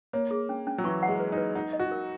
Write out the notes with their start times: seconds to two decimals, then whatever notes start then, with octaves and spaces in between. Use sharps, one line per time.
0.13 A#3 C#5
0.31 G#4
0.49 C#4
0.67 C#4
0.78 F#3
0.84 E3 C#6
1.03 F#5
1.08 G#3
1.20 B4
1.32 D#4
1.37 B4
1.55 D#4 F#5
1.73 D#5
1.79 F#4
1.91 A#4